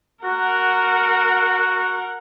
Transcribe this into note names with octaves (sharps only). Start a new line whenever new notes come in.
F#4 A#4 F#5